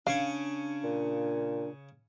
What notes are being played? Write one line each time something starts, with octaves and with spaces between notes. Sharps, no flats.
C#3 D4 C#5 F5
A#2